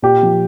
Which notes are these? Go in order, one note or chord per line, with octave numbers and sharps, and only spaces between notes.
A#2 G4
F3